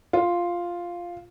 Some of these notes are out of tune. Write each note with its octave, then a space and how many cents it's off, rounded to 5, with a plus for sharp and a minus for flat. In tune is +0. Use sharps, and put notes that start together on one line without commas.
F4 +0